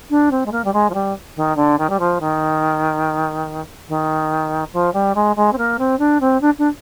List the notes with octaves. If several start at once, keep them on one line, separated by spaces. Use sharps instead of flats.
D4
C4
G#3
A#3
G3
G#3
F3
G3
D#3
D3
D#3
G3
F3
D#3
D#3
F3
G3
G#3
G#3
C4
A#3
C4
D4
C4
D4
D4